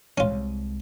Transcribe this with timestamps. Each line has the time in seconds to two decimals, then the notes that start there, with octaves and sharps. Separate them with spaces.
0.18 C2 G#3 C#4 F4